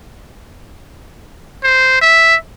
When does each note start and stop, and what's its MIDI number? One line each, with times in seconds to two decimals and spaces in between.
1.63 1.99 72
2.01 2.36 76